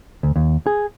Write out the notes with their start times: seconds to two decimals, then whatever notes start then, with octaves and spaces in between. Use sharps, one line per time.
0.23 D2
0.36 D#2
0.66 G#4